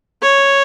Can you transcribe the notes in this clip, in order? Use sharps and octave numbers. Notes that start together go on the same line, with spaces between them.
C#5